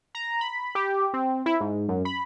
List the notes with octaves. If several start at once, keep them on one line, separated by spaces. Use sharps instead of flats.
A#5
B5
G4
C4
E4
G#2
F#2
B5